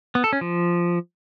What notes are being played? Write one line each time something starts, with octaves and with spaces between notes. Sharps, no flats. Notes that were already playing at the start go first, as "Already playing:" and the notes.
B3
A4
C#4
F3